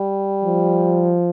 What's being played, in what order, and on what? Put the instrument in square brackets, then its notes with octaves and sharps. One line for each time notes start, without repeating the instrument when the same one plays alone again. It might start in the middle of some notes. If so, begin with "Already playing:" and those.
Already playing: [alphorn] G3
[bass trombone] F3